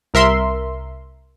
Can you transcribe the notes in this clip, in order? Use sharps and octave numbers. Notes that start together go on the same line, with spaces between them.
C2 A#4 E5 C6